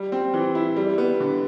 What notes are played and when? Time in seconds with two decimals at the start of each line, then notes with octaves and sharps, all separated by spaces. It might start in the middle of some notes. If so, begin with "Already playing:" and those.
Already playing: G3
0.12 C4
0.34 E3
0.55 E4
0.77 G3
0.98 B3
1.20 D3